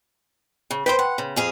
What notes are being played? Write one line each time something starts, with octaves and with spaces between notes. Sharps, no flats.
C#3
B4 C5 D#5 G5 C6
F#5
C#3
F2 G#4 F5